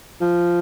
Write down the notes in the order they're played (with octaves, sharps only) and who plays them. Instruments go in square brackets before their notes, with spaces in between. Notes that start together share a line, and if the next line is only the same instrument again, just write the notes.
[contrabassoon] F3